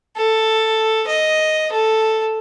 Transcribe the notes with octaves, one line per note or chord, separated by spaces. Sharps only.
A4
D#5
A4